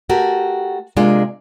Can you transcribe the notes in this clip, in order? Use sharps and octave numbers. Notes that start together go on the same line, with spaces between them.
A3 F#4 G4 A#4
C3 G#3 A#3 D4 F4